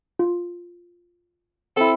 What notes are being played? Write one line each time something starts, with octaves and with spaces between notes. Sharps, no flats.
F4
C4 E4 A4